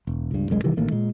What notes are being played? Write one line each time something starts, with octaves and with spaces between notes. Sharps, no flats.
E1
C#2 G2
G1 C2 F#2 G#3
C3 D#3 E3 G3
A1 D#3 A3 A#3
A#2 G#3